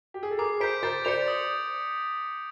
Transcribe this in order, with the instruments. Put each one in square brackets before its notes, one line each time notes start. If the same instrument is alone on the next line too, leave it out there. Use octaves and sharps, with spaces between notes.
[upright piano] G4
G#4
A4
[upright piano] G#4 A#4 [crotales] D6
[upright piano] A#4 C5 [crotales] G6 B6 D7
[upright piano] A#4 C5 [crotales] A6
[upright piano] C5 D5 [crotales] C#7 F7
[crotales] D#6